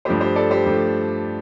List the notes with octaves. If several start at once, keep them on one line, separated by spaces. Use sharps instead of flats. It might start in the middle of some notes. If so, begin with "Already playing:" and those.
G2 F3 A3 G4 C5
G4 C5
A4 D5
G4 C5
G2 F3 A3